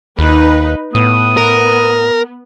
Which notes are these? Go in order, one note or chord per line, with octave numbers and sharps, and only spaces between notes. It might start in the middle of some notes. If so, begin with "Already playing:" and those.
D#2 D#4 B4
A2 B3 D#6
A#4